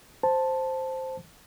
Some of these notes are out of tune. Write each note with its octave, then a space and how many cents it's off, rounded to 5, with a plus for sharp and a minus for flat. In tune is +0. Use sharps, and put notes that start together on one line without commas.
C5 +0 A5 +0